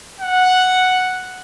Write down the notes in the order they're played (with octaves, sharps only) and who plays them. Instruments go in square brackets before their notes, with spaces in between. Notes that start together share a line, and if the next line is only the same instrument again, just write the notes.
[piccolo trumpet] F#5